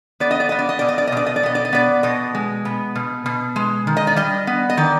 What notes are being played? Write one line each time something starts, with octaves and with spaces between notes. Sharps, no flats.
B3 D5
D#5
D5
B3 D#5
D5
D#5
B2 D5
D#5
D5
D#5
B2 D5
D#5
D5
B3 D#5
D5
D#5
B3 D5
B2 D#5
G#3
B3
B2
B2
G#3
D#3
D#5
D5
G3 D#5
B3
D#5
D#3 D5